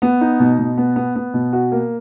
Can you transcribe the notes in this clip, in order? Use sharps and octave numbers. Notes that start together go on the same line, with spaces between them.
B3
D#4
B2
B2
B3
B3
B3
B2
F#4
A#3